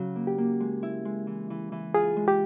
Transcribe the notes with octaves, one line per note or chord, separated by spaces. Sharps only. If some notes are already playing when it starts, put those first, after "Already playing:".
Already playing: C#3 F#3
A#3
G4
A#3
G#3
E4
G#3
E3
E3
E3
F4 G#4
G#3
G4